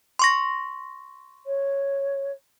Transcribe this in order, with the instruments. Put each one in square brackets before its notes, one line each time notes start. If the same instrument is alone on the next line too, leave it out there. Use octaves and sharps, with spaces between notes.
[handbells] C6 C#6 A#6
[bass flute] C#5